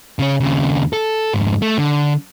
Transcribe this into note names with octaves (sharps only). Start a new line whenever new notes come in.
C#3 C#4
D#2 C#3
A4
F2 G#2
A3
D3